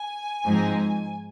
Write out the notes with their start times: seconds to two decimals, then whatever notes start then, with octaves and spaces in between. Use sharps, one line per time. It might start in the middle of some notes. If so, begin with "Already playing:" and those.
Already playing: G#5
0.45 G#2 F3 C4 D#4